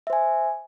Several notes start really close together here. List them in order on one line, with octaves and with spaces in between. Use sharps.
E5 C5 G#5